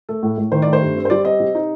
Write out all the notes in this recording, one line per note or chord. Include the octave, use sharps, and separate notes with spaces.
A3 A4
A2
A2
D#3 C5
A3 D5
C5
G2
C4
C5
G3 D5
C4 D#5
C3
D#4